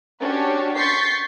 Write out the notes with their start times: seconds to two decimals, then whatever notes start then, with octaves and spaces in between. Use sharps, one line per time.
0.20 C#4 D4 F#4 G4 C#5
0.77 C6 C#6 G6 A6 B6 C7